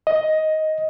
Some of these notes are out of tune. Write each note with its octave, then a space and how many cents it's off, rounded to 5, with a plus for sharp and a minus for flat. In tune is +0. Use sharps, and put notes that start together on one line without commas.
D#5 +10